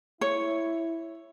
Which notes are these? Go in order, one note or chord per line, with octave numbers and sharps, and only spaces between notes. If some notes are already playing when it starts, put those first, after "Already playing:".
E4 C#5